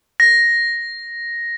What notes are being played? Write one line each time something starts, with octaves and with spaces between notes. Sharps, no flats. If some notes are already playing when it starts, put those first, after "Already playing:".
A#6